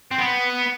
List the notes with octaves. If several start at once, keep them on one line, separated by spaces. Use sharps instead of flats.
C4
B3